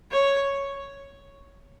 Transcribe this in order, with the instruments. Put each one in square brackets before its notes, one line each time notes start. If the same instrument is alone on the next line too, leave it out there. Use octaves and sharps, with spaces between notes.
[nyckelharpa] C#5